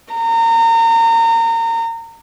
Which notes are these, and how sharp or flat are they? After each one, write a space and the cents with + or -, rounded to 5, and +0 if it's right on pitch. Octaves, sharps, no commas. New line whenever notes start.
A#5 -30